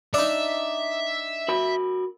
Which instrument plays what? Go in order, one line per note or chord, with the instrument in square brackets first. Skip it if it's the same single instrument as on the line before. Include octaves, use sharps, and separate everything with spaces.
[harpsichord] D4 D#4 [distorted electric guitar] E5
[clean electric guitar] F#4 A#4 B5